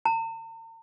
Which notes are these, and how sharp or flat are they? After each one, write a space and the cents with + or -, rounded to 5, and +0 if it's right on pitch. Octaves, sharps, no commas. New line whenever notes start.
A#5 -45